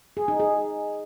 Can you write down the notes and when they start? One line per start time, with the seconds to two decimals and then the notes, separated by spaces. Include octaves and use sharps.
0.17 G#4
0.28 D#4
0.40 G#4